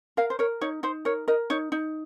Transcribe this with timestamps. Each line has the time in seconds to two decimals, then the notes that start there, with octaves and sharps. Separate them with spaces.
0.17 A#4 F5
0.30 C5
0.39 A#4 C#5
0.61 D#4 C#5
0.83 D#4 C5
1.05 A#4 C#5
1.28 A#4 D#5
1.50 D#4 C#5
1.72 D#4